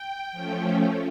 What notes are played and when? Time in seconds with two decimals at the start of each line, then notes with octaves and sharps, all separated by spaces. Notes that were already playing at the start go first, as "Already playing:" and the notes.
Already playing: G5
0.32 F3 A3 C#4